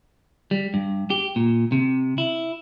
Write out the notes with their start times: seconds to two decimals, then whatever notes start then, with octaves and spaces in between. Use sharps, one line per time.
0.51 G3
0.74 G2
1.10 G4
1.36 A#2
1.72 C3
2.18 E4